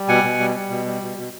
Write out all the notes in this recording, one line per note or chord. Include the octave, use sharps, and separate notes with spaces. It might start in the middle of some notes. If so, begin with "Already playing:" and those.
Already playing: G3
B2 F#5 G#5
B2
G3
G3
B2
G3
B2
B2